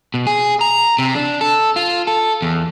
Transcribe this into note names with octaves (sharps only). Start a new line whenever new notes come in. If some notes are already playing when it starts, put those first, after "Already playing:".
B2
G#4
A#5
C3
D4
A4
F4
A4
E2